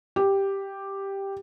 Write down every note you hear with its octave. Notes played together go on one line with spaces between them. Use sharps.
G4